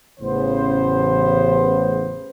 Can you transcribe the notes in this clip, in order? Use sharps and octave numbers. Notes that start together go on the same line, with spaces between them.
A1 C#3 B3 C5